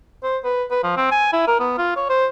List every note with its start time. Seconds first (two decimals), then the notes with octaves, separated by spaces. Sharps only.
0.23 C5
0.44 B4
0.70 B4
0.83 F3
0.97 C4
1.11 G#5
1.33 E4
1.47 A#4
1.60 B3
1.78 F4
1.96 C#5
2.09 C5